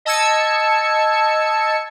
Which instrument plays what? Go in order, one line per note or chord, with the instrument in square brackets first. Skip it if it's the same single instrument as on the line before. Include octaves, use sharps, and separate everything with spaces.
[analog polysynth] D#5 A5 E6 G#6 C#7